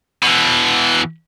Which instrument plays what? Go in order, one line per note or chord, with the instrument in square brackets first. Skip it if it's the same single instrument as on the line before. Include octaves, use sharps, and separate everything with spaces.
[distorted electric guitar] B2 E3